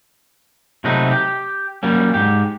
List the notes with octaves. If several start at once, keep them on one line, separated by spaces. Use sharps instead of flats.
C3 F#3 A3 C4 D#4 B4
G4
F#3 G3 A#3 C#4
G#2 G4